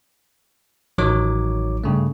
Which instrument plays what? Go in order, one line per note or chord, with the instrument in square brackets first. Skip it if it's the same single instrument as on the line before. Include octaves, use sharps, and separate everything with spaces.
[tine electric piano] A1 D#3 F#3 D#4 C#5 D6
G2 C#3 A3